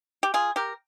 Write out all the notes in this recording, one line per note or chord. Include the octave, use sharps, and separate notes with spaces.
G4
F4 G#4
G4 A#4